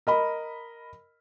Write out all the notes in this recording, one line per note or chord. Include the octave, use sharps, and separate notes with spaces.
A#4 D#5 B5